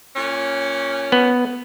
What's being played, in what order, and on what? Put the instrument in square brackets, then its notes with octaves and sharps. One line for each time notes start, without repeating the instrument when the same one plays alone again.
[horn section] A#2 C#4
[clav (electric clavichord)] B3